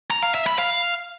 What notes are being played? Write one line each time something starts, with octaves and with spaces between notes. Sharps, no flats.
A#5
F5
E5
B5
F5